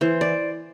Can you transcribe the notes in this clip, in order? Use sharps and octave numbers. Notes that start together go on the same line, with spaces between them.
E3 C5
D5